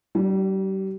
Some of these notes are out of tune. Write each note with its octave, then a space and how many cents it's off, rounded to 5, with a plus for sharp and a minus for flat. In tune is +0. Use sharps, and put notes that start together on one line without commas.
G3 -35 D4 +10